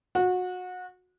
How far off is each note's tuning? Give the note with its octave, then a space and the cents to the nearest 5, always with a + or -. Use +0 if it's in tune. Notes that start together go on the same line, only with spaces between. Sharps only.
F#4 -25